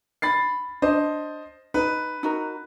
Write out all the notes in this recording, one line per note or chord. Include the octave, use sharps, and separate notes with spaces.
B5 A6 C7
D4 C5 D#5
D#4 B4
D#4 F#4 A#4